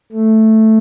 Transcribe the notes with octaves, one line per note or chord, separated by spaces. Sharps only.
A3